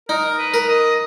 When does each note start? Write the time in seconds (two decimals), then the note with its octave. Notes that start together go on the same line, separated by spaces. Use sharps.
0.09 D#4 A#4
0.38 B4
0.54 A#4
0.68 D#5